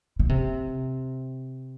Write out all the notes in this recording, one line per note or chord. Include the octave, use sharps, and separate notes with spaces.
C#3
C3